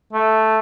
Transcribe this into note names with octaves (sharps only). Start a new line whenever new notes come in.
A3